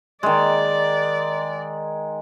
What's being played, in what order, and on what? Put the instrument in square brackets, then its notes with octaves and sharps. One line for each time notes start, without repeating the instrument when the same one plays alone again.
[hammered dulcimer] D#3 G#3 [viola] D5